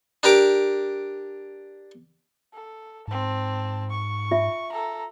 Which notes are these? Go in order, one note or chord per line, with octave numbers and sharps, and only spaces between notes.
D4 G4 A#4 D6
A4
G#2 C4 A5
C#6
F4 E5
A4 A#5